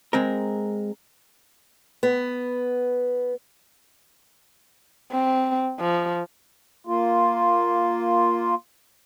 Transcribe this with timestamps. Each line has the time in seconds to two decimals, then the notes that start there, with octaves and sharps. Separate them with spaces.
0.13 G#3 C4 A#4
2.03 B3
5.12 C4
5.80 F3
6.87 A#3 F4